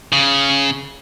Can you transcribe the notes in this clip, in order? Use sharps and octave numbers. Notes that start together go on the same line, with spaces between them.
C#3